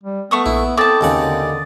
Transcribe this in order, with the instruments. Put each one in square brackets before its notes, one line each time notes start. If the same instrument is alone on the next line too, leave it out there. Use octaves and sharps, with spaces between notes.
[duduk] G3
[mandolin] A3 C#6 D#6 [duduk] B3
[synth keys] A#1 [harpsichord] E4
[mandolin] C4 A5 [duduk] A4 [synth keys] D6 D#6 A6
[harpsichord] D#2 C#3 F#5
[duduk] D3